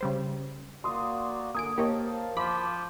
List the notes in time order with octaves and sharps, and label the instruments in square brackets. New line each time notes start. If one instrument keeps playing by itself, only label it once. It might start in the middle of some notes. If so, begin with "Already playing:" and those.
[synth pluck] C#3 G3 C5
[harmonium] A#3 F#4 D5 [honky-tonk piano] C6 D#6
[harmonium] D3 [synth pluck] A#3 G#5 D7 [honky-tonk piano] D#6
[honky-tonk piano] A#3 [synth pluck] G4 C#5 D#5 [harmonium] C5 F5 A5
[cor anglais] F3 [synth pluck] B5 B6 [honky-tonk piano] D6